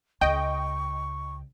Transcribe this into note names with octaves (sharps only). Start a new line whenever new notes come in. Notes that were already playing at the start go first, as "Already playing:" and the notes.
C#2 D#5 G5 C#6